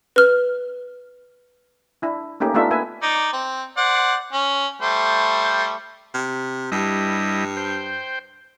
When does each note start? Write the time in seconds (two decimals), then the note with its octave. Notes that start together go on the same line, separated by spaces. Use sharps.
0.16 B4 F6
2.02 D4 E4
2.40 A3 A#3 C#4 D#4 G4
2.54 A3 B3 D4 D#4 F4 E5
2.71 A#3 B4 E5 G#5
3.02 D#4 D5
3.33 C4
3.77 C5 D5 F#5
4.33 C#4
4.82 G3 A3 C5
6.14 C3
6.72 G2 G3 E4 D#5
7.57 C5 G5